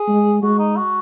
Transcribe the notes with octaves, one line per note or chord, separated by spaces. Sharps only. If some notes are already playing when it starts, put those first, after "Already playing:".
Already playing: G#4
G#3
G#3 F#4
D#4
F#4